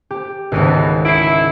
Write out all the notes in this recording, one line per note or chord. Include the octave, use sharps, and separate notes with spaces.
G4
G#1 C#2 B2 E3
E4 C7 D7